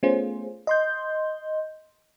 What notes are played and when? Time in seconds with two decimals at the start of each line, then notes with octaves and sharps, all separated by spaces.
0.03 A3 B3 C#4 F4 G#4 C5
0.67 D#5 C6 G6